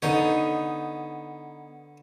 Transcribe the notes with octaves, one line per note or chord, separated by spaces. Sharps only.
D3 B3 D#4 C#5